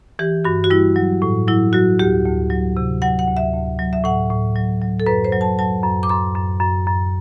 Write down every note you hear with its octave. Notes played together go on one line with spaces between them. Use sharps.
E3 G4
G2 F#4
F#4
G3 E4
F#3
A2
F#3 E4
F#3 F#4
D2 G4
D2
F#3
C3
F#3 F#5
F#5
D2
E5
D2
F#3
E5
A2 F#5
A2
F#3
F#3
A4
F#2 B4
C5
F#3
A5
F#3 A5
F#2
D6
F#2 C6
F#2
F#2
F#2